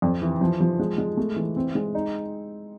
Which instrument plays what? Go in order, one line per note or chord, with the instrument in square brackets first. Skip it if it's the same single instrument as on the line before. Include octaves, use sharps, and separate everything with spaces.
[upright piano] F2
E3
F3
F3
G#3
G#3
A3
E3
C4
G#3
D#4